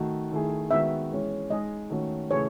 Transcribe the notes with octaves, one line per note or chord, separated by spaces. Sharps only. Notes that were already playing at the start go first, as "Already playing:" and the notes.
Already playing: D#3 A3 D#4 F#4
D#3 A3 E4 G#4
D#3 G#3 B3 F#4 E5
E3 G#3 C#4
G#3 D#4 G#4 D#5
D#3 A3 C#4 F#4
C#3 E3 A3 E4 G#4 C#5